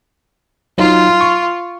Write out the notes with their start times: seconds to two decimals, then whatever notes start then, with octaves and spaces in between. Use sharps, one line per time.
0.78 F#3 D#4 F4 C6
1.21 C#6